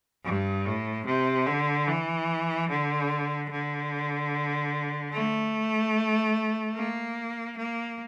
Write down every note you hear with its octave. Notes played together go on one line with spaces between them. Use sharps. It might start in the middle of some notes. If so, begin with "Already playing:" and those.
G2
A2
C3
D3
E3
D3
D3
A3
A#3
A#3